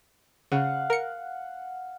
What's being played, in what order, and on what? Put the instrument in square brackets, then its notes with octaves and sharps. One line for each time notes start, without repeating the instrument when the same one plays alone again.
[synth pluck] C#3 [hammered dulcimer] F5 F#5
[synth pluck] A#4 C#7